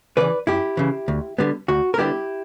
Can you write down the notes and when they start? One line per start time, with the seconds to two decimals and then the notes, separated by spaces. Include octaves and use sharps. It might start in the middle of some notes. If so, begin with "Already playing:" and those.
0.17 C#3 E3 B4 D5
0.47 F#2 E4 G4
0.77 C#3 E3
1.08 D2
1.38 D3 G3 B3
1.68 D2 F#4
1.94 A#4
1.98 D3 G3 B3 E4 G4